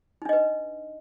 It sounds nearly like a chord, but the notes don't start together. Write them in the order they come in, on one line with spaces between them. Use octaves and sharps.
D#4 D4 D#5 B4